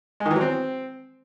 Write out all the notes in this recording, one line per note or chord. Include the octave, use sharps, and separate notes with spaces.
G#3
D#3
E3
F#3
C4